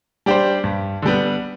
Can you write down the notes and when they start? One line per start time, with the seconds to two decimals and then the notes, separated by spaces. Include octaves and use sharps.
0.26 G3 D4 G4 C5
0.64 G2
1.02 D3 G3 B3